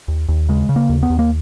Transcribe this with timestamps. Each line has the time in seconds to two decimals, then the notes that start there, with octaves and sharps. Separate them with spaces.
0.08 D#2
0.29 D#2
0.49 C#3 G#3
0.69 C#3
0.76 A#3
0.89 D#2
1.03 B3
1.10 D#2
1.19 A#3